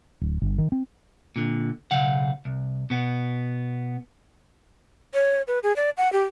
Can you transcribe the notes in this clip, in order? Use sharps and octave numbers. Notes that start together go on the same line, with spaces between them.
D1
G1
D#3
C4
A#2 D3
B1 C#3 F5 F#5
C2
B2 B3
C#5
B4
G#4
D5
F#5
G4